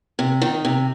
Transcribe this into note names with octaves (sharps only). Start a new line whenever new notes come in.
C3
D#3
C3